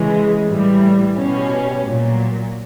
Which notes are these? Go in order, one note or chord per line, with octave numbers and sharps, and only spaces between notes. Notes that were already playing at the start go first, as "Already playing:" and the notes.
Already playing: C#3 E3 G#3
A2 E3 G3
B2 G3 C#4
A#2 F#3